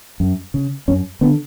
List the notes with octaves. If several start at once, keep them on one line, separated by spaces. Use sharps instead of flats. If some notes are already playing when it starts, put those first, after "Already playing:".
F#2
C#3
F#2 C#4
D3 B3